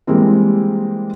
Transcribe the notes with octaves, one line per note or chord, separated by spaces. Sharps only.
E3 G3 G#3 A#3 C4